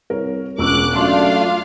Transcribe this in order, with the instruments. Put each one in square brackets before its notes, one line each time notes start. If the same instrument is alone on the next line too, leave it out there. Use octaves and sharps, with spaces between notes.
[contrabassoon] C2 [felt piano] A#4 C#5
[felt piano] E1 C#6 E6 [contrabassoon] C#2 [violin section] D6 F#6
[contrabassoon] F#2 [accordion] A3 D4 [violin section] F4 F5 [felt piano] C6